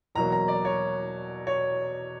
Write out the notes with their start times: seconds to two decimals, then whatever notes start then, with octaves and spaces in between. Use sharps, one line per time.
0.15 E2 B2 F#3 A#3 A#5
0.32 A#5
0.48 D5
0.65 C#5
1.47 C#5